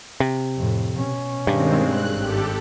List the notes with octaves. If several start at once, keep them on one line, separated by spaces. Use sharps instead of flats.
C3
F2 A2
B2 C#4
G2 D#3 G#3 C4
F#6
G#1 G4 A4